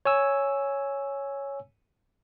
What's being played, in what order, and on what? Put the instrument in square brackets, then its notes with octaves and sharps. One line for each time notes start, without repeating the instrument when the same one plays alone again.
[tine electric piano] C#5 G#5 E6